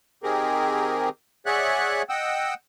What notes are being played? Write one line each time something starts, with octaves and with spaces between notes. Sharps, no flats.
D#3 C4 G4 G#4 A#4
G#4 C#5 D5 E5 F#5 F#6
D#5 F#5 G5 E6